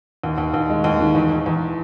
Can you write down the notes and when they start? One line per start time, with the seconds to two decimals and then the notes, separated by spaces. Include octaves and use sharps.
0.24 D#2
0.38 D#2
0.54 D#2
0.69 G#3
0.84 D#2
1.00 D#3
1.15 E2
1.30 E2
1.46 E2